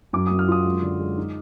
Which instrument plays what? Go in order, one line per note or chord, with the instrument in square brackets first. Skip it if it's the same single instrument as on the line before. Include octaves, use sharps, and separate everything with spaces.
[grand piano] F#2 D6
D#6
F#2
F6
F4 D#6
G#3
D3
G#3
D#4